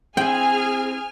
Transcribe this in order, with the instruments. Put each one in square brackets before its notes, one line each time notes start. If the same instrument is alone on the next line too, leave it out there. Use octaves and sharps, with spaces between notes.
[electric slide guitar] C4 E4 [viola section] G#4 [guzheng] G5 [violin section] G#5 F6